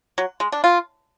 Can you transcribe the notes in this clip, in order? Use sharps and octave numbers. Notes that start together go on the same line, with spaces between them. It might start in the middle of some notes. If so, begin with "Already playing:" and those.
F#3
G#3
D4
F4